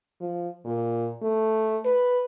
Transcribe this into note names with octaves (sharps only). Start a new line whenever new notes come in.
F3
A#2
A3
B4